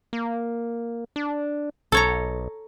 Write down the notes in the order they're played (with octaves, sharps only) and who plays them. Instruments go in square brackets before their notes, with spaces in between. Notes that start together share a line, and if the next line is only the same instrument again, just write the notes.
[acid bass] A#3
D4
[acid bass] B1 [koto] A4 C#5 A#5